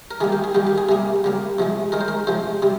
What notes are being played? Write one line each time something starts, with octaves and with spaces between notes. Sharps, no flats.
A#4
D#3 G3 A#3 G#4
G4
G#4
D#3 G3 A#3 G4
G4
G#4
C3 G3 A#3 G#4
C#3 G3 A#3
C3 F3 G#3
D#3 G#3 A#4
C5
A#4
C3 F3 G#3 C5
C3 G3